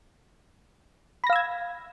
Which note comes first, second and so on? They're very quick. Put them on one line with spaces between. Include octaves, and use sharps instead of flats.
B5 A#6 F5 E6 G#6